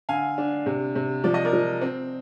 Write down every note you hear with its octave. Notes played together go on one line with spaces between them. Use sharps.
D3 F5 G#5
D4
C3
C3
F3 D5
D#5
A#4 D5
F3
C4